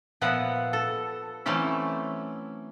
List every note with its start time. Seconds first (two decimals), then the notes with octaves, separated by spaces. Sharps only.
0.21 A#2 F3 B3 E5 F#5
0.73 A4
1.46 E3 F#3 A3 C4 C#4 E4